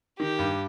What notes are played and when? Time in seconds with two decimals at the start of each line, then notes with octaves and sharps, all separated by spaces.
0.19 D#3 G4
0.39 G2